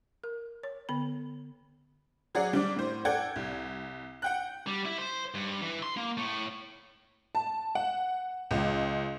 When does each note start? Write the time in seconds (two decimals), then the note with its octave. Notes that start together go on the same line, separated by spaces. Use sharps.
0.24 A#4
0.63 C#5
0.89 D3 B3 B5
2.35 F#3 G#4 D5 F#5
2.53 G3 D4 D6
2.76 A2 C5
3.05 A4 D5 F#5 G5 G#6
3.36 C2
4.22 F#5 G5 F#6
4.67 G3
4.85 E4
4.98 C5
5.35 G2
5.61 E3
5.83 C6
5.97 A#3
6.17 A2
7.35 A5
7.75 F#5
8.51 C#2